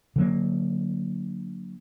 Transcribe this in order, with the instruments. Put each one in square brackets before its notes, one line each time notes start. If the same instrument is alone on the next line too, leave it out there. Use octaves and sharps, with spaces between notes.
[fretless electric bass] D3 F#3 A#3